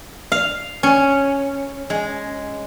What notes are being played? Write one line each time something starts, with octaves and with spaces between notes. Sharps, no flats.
F5
C#4
G#3